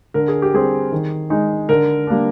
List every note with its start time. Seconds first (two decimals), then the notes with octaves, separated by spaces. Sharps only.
0.14 D3 A#4
0.28 G#4
0.42 G4
0.53 G3 C4 G#4
0.92 D#3
1.30 G#3 D#4
1.69 D3 A#4
2.07 G3 A#3 D4